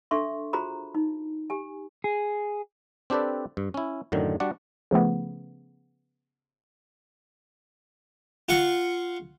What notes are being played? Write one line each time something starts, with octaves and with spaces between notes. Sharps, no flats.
D4 A4 E5 C6 C#6
F4 F#4 G#4 C5 A#5 B5
D#4
G4 G#5
G#4
C4 D4 G4 A4 B4 D5
G2
C#4 E4
F#2 A2 D3 D#3
G3 D4 F#4 D5 F#5
C#3 F3 A3 B3
F4 F#5 C#6